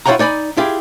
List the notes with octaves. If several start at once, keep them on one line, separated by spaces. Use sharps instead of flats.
E4 F4 C#5 F#5 G5 A#5
D#4 D5 G#5 B5
E4 F4 G4 G#4